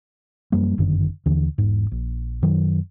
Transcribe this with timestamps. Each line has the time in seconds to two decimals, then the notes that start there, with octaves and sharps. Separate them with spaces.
0.52 F#2 F3 G3 A#3
0.78 G1 F#2 D3 D#3
1.26 D#2 D3 E3
1.58 E1 G#2
1.92 A#1
2.42 F#2 D#3 F#3